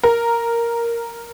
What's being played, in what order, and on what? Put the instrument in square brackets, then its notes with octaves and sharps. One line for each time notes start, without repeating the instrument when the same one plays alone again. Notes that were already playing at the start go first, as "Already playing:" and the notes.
[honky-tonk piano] A#4